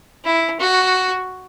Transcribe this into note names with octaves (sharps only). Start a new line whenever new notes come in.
E4
F#4